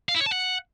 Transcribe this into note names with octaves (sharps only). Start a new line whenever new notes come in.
F5
E4
C#5
A5
F#5